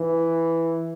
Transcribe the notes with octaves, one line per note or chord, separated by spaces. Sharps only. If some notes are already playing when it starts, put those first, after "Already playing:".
Already playing: E3